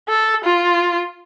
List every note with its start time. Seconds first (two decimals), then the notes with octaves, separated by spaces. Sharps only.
0.08 A4
0.44 F4